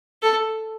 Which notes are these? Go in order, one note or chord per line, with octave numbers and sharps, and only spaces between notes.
A4